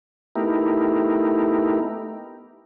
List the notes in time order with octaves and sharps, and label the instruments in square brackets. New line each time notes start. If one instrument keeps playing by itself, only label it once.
[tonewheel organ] A3 B3 D#4 E4 G4 A#4